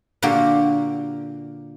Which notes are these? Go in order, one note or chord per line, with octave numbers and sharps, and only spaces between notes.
A#2 D3 A#3 F#4 G4